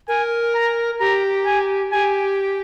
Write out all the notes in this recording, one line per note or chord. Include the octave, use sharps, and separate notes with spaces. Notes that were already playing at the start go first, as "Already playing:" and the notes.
A#4 G#5
A#5
G4 A#5
G#5
G4 G#5